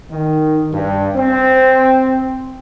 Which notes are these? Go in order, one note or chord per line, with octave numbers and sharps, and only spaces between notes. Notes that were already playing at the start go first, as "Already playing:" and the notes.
D#3
G2
C4